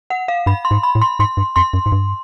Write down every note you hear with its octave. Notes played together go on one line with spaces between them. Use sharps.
F#5
F5
G2 B5
C6
G#2
B5
A2
C6
G#2 C6
G2
F2 C6
F#2
G#2
G2